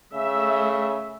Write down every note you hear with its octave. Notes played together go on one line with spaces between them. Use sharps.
C#3 A3 E5